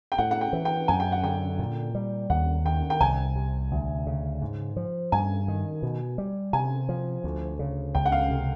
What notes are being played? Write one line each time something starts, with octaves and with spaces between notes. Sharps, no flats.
G5
A2 F#5
F#5
G5
E3
G5
F#2 G#5
G5
F#5
D3 G5
A#2
G3
D#2 F#5
D#3 G5
G5
C2 G#5
C3
D2
C#3
G#2
F3
G2 G#5
D#3
B2
G3
C3 G#5
F3
D2
C#3
C#2 G5
F#5
F5
C3